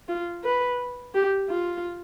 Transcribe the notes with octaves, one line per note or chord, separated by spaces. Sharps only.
F4
B4
G4
F4